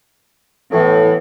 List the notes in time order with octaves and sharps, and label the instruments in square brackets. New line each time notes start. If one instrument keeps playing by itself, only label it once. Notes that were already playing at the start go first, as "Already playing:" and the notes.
[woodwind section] A2 [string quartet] E3 B3